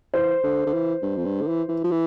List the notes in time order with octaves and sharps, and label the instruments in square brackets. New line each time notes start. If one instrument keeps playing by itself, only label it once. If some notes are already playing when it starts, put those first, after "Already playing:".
[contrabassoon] E3 [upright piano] C5
[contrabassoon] D3
D3
E3
G2
F2
G2
D3
E3
E3
F3
E3